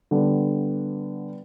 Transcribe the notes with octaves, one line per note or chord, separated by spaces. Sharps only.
D3 G3 B3